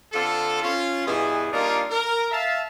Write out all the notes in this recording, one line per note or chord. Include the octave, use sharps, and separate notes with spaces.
D3 C4 F4 A4
C#4 F4
G2 B2 E3 G#4
G3 A#3 D4 D#4 F4 A#4
A#4
E5 F5 A5